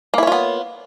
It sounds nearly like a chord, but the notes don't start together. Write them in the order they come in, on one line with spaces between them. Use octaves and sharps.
A#3 E4 C#5 F4 B3